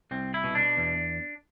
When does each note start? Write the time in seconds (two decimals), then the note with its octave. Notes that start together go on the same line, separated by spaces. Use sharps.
0.11 C2 C4
0.34 E4
0.44 B2
0.55 D4
0.77 E2